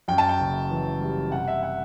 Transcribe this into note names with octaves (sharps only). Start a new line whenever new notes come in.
F#2 G5
A5
G5
F#1
E3
G3
C3 F#5
E5
F#5